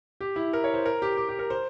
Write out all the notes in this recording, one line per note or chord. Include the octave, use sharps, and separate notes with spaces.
G4
E4
A#4
C#5
C5
A#4
G4
G4
G4
A#4
C5